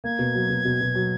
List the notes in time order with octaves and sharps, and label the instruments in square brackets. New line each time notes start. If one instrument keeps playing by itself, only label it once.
[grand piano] A#3 [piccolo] G#6
[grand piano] B2
F#3
B2
B2
B2
F#3